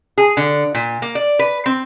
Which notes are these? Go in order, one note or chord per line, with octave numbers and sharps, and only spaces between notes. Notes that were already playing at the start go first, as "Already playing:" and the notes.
G#4
D3
A#2
A#3
D5
B4
C4